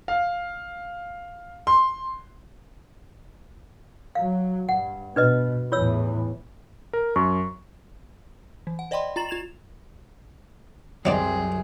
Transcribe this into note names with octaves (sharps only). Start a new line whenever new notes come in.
F5
C6
F#3 F5
G2 F#5
B2 D4 B4 D#5
E2 A2 E3 F4 C#5 E6
A#4
F#2 C#6
E3
F#5
C5 D5 D#5 G5 B5 C6
F4 A#5 A6 E7 F#7
F4 G#6 E7 F7
C2 F#2 F#3 C4 D#4 G#4 D5